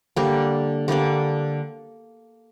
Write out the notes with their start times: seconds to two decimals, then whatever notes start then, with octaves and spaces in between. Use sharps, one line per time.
0.16 D3 G3 A#3 D4
0.88 D3 G3 A#3 D4